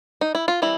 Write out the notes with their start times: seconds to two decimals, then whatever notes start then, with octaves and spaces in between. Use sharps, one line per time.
0.21 D#4
0.35 E4
0.48 F4
0.62 E3 G3 C4 E4